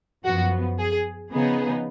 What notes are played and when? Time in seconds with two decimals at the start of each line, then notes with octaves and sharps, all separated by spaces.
0.25 F#2 F3 B3 F#4
0.79 G#4
1.32 C#3 F3 B3 D#4 G#4